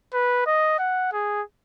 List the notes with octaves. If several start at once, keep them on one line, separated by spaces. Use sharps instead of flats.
B4
D#5
F#5
G#4